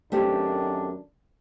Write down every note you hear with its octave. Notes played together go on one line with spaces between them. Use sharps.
F#2 D#3 A3 C4 D4 G4